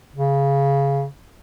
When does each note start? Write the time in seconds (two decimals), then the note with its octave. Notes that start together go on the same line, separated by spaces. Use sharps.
0.16 C#3